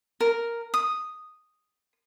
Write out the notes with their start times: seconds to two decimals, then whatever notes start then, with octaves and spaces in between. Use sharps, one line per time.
0.21 A#4
0.74 D#6